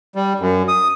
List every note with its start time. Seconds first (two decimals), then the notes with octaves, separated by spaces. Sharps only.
0.15 G3
0.40 F#2
0.68 D#6